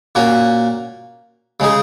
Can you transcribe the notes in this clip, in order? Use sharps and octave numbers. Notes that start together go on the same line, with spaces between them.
A#2 A#3 C#4 F#4
C#3 G#3 D#4 G#4